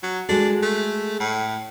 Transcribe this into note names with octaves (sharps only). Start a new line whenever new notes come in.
F#3
G#3 D4 F#4 A4
A3
A2